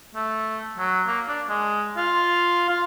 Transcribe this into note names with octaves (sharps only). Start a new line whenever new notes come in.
A3
F#3
A#3
D4
G#3
F4
F4